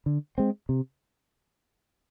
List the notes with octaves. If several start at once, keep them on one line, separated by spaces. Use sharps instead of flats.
D3
G#3 C4
C3